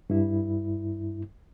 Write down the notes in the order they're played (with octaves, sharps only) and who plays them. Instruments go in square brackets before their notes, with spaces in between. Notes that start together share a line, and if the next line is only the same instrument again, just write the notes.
[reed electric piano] G2 E4